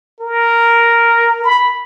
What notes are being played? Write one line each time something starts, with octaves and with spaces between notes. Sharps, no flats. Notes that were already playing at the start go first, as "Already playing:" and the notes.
A#4
B5